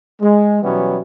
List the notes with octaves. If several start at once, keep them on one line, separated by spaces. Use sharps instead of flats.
G#3
B2 E3 F#3 G3 B3 C#4